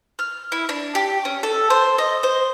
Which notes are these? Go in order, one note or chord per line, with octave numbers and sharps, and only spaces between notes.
F6
E4
D4
G4
C#4
A4
C5
D#5
C5